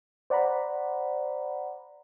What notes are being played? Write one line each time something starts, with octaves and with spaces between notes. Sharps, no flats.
C5 D5 F#5 A#5 B5